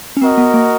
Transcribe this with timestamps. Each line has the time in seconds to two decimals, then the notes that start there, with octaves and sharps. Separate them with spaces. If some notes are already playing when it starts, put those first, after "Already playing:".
0.17 C#4
0.22 C4 F#4 A#4 D#5
0.38 B3
0.54 A#3